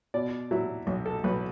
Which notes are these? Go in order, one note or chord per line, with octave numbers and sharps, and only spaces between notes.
B2 D5
F#3 E4
B1
A4
B1 B4